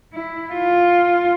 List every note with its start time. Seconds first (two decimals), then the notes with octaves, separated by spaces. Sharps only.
0.13 E4
0.53 F4